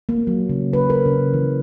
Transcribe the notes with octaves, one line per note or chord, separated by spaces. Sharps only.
A#3
F#3
C#3
B4
A#4
C#3
E3